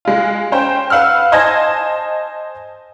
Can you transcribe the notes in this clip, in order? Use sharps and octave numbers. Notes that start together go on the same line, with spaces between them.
G#3 F4
C#4 C5 G5
B4 F5 F#5 E6 F6
C5 D#5 G#5 A5 G#6 A#6